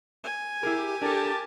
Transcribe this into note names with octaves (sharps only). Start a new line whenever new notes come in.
G#5
E4 G4 G#4 A#4
D4 G4 A4 A#4 A5